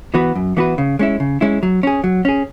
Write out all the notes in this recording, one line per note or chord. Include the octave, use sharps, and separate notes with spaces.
E3 B3 F#4 B4
F#2
E3 B3 F#4 B4
C#3
G#3 C#4 E4
C#3
G#3 C#4 E4
F#3
C#4 G#4
F#3
C#4 G#4